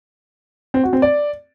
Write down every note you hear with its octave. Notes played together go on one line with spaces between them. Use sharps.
C4
F#4
C4
D5